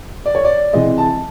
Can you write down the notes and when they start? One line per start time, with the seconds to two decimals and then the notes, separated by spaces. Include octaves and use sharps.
0.26 D5
0.35 C#5
0.44 D5
0.73 C3 E3 G#3 D#5
0.98 A5